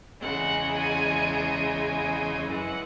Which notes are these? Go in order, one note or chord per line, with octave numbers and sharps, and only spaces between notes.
E2 C#3 G#3 F#5
G#5
G#5
F#2 E3 G#3 F#5